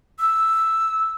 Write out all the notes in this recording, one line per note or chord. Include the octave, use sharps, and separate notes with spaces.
E6